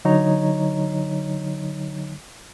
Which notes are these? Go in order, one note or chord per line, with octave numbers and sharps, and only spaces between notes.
D3 F#3 D#4 C#5 D#5 A#5